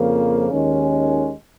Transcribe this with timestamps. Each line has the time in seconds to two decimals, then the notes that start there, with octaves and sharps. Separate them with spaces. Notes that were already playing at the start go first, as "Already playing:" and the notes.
Already playing: F2 C#3 F3 A#3
0.51 D#2 D#3 G#3 C#4